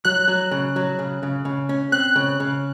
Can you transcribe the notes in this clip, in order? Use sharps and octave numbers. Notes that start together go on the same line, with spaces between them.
F#3 F#6
F#3
C#3
F#3
C#3
C#3
C#3
C#4
C4 F#6
C#3
C#3